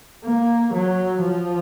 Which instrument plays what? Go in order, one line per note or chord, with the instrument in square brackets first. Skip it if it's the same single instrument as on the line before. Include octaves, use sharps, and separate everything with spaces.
[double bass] A#3
F#3
F3